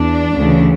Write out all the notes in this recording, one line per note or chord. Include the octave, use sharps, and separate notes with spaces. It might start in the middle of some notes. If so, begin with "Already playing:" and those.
Already playing: E2 D4
D2 C#3 E3